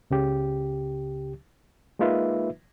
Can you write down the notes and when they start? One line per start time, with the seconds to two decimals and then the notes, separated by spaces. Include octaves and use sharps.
0.10 C#2 C#3 G4
1.99 G#3 A#3 D#4 F4 B4 E5